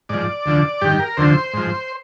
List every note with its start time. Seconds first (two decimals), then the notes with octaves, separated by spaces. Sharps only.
0.09 G#2 F3 D5
0.46 D2 D3 F3
0.81 G2 D#3 G4
1.00 A#4
1.17 D2 D3 F3 C5
1.54 G#2 F3